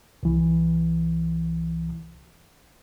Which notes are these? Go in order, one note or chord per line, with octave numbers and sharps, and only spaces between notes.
C2 E3